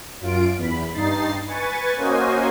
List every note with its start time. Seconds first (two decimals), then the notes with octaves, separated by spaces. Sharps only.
0.20 F#2 F4 D7
0.57 E2 B5
0.93 G2 D#4 A6 C7
1.47 B4 G#5 C#6 A6
1.97 A#3 C#4 F#4 C5 D#5 G#5